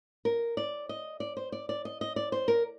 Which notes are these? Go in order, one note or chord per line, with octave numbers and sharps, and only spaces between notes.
A#4
D5
D#5
D5
C5
D5
D5
D#5
D#5
D5
C5
A#4